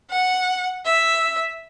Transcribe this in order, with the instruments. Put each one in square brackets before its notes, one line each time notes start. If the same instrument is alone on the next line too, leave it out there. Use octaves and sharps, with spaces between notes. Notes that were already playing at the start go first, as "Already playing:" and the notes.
[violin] F#5
E5